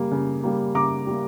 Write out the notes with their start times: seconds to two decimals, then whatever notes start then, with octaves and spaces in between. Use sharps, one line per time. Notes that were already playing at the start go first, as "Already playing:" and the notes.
Already playing: C#3 G3 A#3
0.11 C#3
0.43 G3 A#3
0.75 C#3 A#5 D6
1.07 G3 A#3